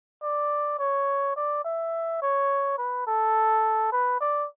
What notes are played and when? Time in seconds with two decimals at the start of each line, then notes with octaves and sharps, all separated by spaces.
0.23 D5
0.79 C#5
1.36 D5
1.65 E5
2.22 C#5
2.78 B4
3.07 A4
3.92 B4
4.20 D5